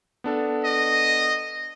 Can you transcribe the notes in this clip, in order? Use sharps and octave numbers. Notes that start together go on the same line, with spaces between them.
B3 D4 A4
D#5